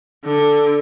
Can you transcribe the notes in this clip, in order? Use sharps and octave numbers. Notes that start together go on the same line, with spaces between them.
D3